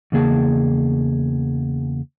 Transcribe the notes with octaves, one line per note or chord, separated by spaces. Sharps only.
E2 C#3 A#3 G#4 A5